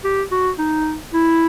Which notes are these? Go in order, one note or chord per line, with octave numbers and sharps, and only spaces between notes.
G4
F#4
D#4
E4